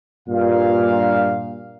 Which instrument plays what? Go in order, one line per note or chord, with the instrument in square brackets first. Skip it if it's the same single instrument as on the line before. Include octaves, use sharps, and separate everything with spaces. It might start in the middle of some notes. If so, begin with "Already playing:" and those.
[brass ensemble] G2 A#2 F5